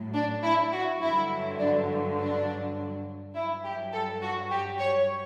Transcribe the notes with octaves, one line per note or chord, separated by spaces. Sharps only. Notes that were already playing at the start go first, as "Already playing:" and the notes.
Already playing: A2 F#3
D4
E4
F#4
G2 D3 F#3 E4
D4
D4
G2 F#3 E4
G4
A4
F#4
G4
C#5